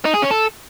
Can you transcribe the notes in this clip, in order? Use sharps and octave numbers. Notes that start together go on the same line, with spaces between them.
D#4
G#4
C#4
A4